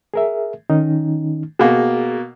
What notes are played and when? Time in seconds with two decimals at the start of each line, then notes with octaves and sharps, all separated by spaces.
0.14 G#4 A#4 E5
0.70 D#3 C#4 D#4
1.59 B2 A#3 G#4